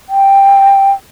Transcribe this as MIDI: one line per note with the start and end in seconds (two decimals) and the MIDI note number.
0.09 0.91 79